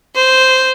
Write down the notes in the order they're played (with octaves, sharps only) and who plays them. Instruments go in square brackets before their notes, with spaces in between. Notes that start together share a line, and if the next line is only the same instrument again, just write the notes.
[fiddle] C5